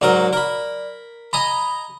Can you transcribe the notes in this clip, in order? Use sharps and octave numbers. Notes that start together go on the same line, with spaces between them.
G#2 F#3 A#4 D5
A#4 B5
D#5 G#5 A#5 B5